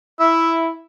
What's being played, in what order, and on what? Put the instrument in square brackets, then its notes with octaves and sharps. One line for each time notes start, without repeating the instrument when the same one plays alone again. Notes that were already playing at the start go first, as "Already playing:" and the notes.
[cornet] E4 [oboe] E5